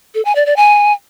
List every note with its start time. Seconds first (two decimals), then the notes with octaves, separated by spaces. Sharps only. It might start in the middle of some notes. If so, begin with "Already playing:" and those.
0.15 A4
0.25 G#5
0.35 D5
0.46 D5
0.56 G#5